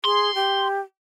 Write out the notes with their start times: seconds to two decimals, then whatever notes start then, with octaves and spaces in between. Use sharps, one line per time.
0.05 G#4 C6
0.35 G4